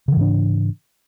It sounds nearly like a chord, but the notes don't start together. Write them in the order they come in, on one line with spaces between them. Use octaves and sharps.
C#3 E3 G#2 D4